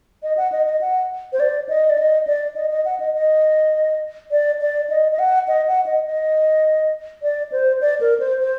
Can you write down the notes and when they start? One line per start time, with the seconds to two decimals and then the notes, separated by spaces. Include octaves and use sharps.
0.23 D#5
0.37 F#5
0.52 D#5
0.66 D#5
0.81 F#5
1.33 C5
1.40 D5
1.69 D#5
1.90 D5
1.98 D#5
2.27 D5
2.56 D#5
2.71 D#5
2.85 F#5
3.00 D#5
3.14 D#5
4.31 D5
4.61 D5
4.90 D#5
5.12 D#5
5.19 F#5
5.48 D#5
5.67 F#5
5.86 D#5
6.06 D#5
7.22 D5
7.52 C5
7.81 D5
8.01 A#4
8.20 C5
8.40 C5